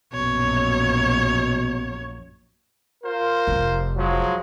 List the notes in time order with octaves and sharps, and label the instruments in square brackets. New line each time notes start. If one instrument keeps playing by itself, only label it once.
[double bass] A#1 F#2 [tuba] B2 [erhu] C#5
[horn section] F4 A#4 C5
[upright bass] F1
[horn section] F3 F#3 G#3